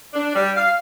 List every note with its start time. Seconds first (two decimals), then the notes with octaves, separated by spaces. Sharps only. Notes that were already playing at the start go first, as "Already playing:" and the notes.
0.14 D4
0.34 G3
0.56 F5